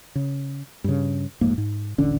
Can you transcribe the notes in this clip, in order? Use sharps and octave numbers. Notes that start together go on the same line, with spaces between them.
C#3
G2 C#3
D1 F2 G#2 A#3
G#2
D#1 A1 D3 C#4